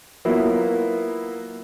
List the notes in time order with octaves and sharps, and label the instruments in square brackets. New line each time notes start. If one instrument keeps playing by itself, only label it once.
[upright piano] F#3 A#3 B3 E4 F4